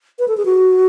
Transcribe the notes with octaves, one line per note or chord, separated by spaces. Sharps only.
B4
A4
G#4
F#4